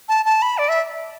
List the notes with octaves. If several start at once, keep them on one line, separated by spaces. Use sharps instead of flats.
A5
A5
B5
D5
E5